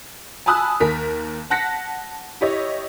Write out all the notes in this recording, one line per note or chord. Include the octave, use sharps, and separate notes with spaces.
G#5 A5 B5 D#6 E6 F#6
D#2 A#4 B6
F#5 A5 F#6 A#6 B6 C#7
E4 G4 C#5 D#5